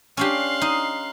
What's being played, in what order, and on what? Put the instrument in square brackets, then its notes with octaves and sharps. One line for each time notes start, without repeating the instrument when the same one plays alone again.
[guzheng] C#4 D4 G4 [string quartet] F5 C6 F#6
[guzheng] D#4